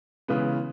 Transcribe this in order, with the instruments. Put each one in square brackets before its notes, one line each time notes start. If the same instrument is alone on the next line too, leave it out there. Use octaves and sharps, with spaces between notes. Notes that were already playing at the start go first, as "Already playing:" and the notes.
[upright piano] C#3 E3 G#3 B3